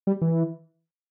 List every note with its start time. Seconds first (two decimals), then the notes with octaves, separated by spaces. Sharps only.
0.07 G3
0.21 E3